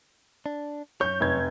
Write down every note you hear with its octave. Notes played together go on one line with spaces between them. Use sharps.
D4
F#2 C#5 G6
F1 G#6